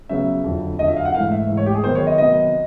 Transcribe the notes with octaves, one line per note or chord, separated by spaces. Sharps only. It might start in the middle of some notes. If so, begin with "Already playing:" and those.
C#3 F#3 B3 E5
F2 D3 F#3
F2 D3 F#3 D#5
E5
F5
F#5
G#2 E3 A3 F5
E5
G#2 E3 A3
C#5
G4
G#4
C3 D#3 F#3 B3 C5
C#5
D#5
C3 D#3 F#3 B3 D#5